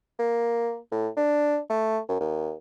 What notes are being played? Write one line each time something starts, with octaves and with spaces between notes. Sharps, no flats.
A#3
A2
D4
A3
F#2
D#2